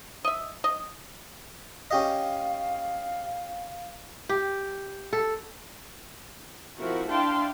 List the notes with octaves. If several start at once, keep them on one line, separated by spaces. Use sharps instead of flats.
D#5 E5
D#5
C#4 G4 D#5 F5
G4
A4
F3 C4 E4 F#4 A#4
D4 E4 F5 G5 A5 C6